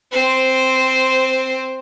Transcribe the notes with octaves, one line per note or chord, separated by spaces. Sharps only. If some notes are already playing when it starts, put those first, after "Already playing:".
C4 C5